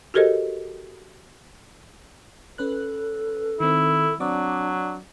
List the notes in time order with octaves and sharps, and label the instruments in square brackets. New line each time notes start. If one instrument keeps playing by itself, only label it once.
[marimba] F#4 G4 A4 A#4 C5 D#5
[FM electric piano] C#4 B4 F#6 [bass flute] A4
[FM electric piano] D#3 C4 [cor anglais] E4
[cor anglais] F#3 [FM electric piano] C4 D5 D6 [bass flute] D4